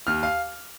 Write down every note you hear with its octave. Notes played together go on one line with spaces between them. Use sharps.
D#2 F6
F5